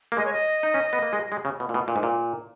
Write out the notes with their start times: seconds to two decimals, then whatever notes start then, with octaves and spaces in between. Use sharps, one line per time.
0.12 A#3
0.17 G#3 D#5
0.25 C#5
0.33 D#5
0.63 D#4
0.74 C#4
0.93 B3
1.02 A#3
1.13 G#3
1.32 G#3
1.45 C#3
1.60 B2
1.69 A#2
1.74 B2
1.88 A#2
1.96 G#2
2.03 A#2